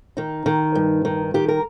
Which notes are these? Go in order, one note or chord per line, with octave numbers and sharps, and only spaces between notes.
D#3 D#4
D#3
G2
D#3
D#3 G4
A#4